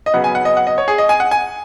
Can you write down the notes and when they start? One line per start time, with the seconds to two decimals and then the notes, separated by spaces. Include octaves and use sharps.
0.06 D#5
0.13 C#3 F#3 B3 F#5
0.24 G#5
0.35 F#5
0.45 D#5
0.57 F#5
0.67 D#5
0.78 C#5
0.88 G#4
0.98 D#5
1.09 G#5
1.20 F#5
1.31 G#5